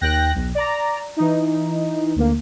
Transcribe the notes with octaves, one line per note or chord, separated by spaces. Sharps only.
D#2 G5 F#6 A#6
B1
D5 A#5
E3 D#4
D2 A#3